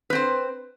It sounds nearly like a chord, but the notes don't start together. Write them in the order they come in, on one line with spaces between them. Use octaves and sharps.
B4 C4 C5